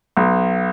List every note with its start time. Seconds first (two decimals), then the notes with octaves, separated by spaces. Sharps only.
0.17 B1